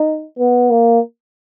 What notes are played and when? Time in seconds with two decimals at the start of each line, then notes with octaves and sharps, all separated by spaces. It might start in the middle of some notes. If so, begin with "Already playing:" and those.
Already playing: D#4
0.39 B3
0.71 A#3